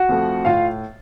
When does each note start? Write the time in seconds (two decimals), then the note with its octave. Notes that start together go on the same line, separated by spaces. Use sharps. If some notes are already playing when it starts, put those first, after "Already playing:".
Already playing: F#4 F#5
0.09 F2 F3 A3
0.45 A2 F4 F5